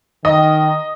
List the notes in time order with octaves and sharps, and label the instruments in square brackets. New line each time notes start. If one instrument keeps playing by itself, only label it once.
[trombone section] D#3 [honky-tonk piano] D#5